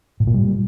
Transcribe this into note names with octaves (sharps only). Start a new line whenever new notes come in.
A2
A#2
G3